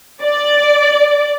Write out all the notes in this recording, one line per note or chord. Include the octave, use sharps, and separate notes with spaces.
D5